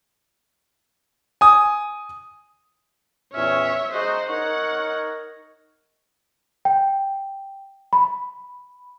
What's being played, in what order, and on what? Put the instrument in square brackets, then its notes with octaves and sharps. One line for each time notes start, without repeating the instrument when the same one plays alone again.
[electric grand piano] G#5 D#6
[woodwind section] E2 A#2 C#4 [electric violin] C#5 E5
[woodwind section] G#3 D#4 F#4 [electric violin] C5 D#5
[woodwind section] D#4 A#4 C#5 [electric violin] F#5
[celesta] G5
B5